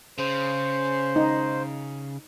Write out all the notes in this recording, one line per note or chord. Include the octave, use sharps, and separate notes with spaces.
C#3 C5
D#4